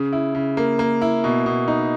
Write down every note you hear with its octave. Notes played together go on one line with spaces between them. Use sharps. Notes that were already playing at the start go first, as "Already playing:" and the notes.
Already playing: C#3
E4
C#3
A#3
A#3
E4
B2
B2
D#4